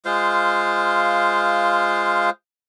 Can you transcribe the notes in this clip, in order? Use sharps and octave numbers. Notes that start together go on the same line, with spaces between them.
G#3 F4 C5 F5